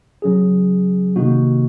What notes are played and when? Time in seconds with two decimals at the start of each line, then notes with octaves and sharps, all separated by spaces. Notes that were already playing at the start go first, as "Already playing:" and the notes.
0.22 C#3 F#3 C#4 G#4
1.16 C3 D#3 A#3 D#4 F#4